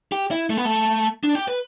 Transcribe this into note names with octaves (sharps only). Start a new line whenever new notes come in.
G4
E4
A3
B3
A3
D4
G4
B4